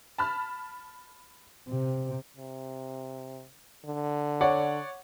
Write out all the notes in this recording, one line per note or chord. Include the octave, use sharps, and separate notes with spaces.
A5 B5 F6
C3
C3
D3
C#5 D5 F#5